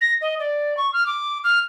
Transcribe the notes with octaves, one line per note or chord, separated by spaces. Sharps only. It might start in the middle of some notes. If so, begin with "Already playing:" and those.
A#6
D#5
D5
C#6
F6
D6
F6